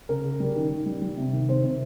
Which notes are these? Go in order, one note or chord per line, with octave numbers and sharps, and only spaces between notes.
C#3 A#4
C#3
G3
D#3
D#3
G3
G3
C3
D#3
C3 C5
C3